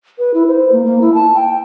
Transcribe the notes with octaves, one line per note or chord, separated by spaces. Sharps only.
B4
E4
C5
A#3
A#3
E4
A5
G5